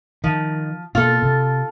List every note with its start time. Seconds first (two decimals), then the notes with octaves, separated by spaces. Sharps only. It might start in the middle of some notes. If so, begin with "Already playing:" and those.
0.24 D#3 F3
0.95 B2 A#3 F4 A4
1.22 C3